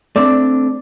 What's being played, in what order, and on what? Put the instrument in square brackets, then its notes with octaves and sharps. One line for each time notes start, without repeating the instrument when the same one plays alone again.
[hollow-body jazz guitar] A3 C4 D4 [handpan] D5